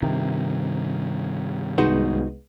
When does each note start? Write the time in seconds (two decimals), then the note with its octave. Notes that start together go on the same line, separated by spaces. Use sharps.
0.03 G2 C3 D#3
1.78 C2 G#3 B3 D#4 F#4 C5